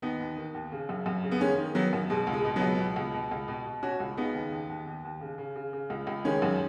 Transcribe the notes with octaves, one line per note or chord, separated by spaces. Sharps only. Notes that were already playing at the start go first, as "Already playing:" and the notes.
D#2 B3 D#4
D#2
D#3
D#2
C#3
F#2
F#2
C#3
B3
D#3 G#3 C#4
D#3
D#3 F#3 B3
F#2
B2 G#3
C#2
G#3
B2
F#3 B3
C#2
B2
C#2
B2
C#2
B2
B2
B2 C#4 F#4
C#2
C#3 B3 D#4
D#2
D#2
D#2
D#2
D#2
C#3
C#3
C#3
C#3
C#2
C#2
D#3 G#3 C#4
F#2